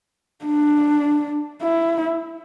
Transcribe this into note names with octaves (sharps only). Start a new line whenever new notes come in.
D4
E4